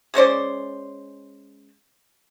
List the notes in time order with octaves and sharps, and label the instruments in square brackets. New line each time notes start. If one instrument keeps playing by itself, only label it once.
[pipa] G#3 C#4 C5 D5